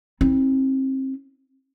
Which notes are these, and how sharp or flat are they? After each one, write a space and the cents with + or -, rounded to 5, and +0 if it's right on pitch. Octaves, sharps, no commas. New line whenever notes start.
C4 +30 E4 -45